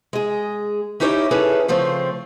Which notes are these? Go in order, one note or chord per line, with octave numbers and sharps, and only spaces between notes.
G#3 G#4
C#4 D#4 E4 G4 B4 C#5
C#4 E4 G#4 A4 B4 C#5
C#3 F3 A3 C4